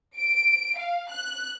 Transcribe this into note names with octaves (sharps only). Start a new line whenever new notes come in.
D7
F5
F#6